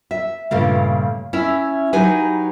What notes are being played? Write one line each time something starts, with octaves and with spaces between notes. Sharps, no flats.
E5
G2 A#2 C#3 A3
C#4 E4 E5
F#3 D#4 G4 B4 G#5